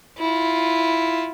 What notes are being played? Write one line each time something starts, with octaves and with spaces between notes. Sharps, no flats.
E4 F4